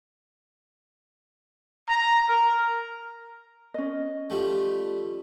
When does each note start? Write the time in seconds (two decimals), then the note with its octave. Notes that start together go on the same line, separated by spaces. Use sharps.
1.88 A#5
2.27 A#4
3.74 C#4 D#5
4.30 F3 G3 A3